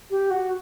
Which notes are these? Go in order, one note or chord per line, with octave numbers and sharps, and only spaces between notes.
G4
F#4